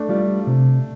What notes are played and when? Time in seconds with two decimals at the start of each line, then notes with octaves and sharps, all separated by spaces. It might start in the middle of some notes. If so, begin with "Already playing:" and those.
Already playing: A3 D4
0.09 G3 F4 D5
0.47 C3